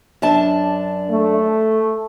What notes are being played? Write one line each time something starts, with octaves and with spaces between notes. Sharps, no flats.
F#2 D4 A5
A3